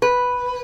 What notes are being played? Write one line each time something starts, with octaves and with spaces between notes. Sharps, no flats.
B4